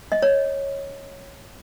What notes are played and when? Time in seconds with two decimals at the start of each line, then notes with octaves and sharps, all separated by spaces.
0.12 D#5
0.22 C#5